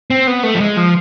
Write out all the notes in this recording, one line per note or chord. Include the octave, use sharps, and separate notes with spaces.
C4
B3
A3
F3
G#3
F3